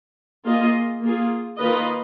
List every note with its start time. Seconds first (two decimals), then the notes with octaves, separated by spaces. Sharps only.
0.45 A#3 F4 G#4 D#5
1.01 A#3 F4 G#4
1.57 D#3 A#3 F4 B4 D#5